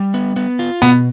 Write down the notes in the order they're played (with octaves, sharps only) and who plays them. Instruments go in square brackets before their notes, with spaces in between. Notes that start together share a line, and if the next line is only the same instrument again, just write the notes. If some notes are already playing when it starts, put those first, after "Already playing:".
Already playing: [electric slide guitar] G3
B3
B3
F4
[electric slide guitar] B2 [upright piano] B3